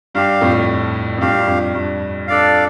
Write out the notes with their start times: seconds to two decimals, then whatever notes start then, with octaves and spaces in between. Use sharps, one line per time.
0.15 G2 G4 F5
0.41 F2 A2
1.18 F2
1.21 G2 G4 F5
1.40 G2
1.47 F2
1.75 G2
2.27 D4 A4 D5 F5